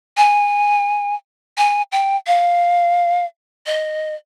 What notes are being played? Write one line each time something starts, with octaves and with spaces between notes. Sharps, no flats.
G#5
G#5
G5
F5
D#5